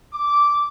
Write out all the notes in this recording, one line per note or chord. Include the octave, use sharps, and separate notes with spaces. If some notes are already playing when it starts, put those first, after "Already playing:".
D6